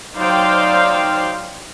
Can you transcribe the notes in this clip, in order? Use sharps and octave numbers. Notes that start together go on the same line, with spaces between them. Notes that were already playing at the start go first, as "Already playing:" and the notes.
F#3 D#4 C5 D5 F5 G5